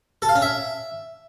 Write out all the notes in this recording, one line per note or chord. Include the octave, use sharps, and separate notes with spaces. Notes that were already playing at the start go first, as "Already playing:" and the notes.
A4
F5
C#4
E5